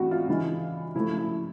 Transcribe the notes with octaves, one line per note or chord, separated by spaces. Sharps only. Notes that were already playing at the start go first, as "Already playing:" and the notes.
Already playing: G2 E3 A3 C4 F#4
F4
C#3 E3 G#3
C#3 F3 A3 E4
E4